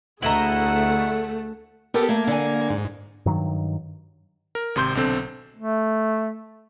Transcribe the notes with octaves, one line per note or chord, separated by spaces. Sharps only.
D2 A3 E4 G#4 D#5 F#5 A#5
B3 G4 A4 A#4
A3 A#3 G#6
D3 G#5
G#2
G2 D#3 F#3
A#4
G#1 C3 C6 G6
B1 D3 C4 A4
A3